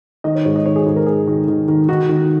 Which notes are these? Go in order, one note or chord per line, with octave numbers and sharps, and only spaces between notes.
D#3 D#5
C#5
G#2 C#5
D#5
D#3 C#5
G#4
G#2
A#4
G#2 G#4
D#3
D#3
D#3
D#3 F#4
D#3